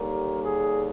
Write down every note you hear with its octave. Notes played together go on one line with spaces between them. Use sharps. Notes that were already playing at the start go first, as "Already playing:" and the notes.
Already playing: D#2 D3 G3 A#4
G#4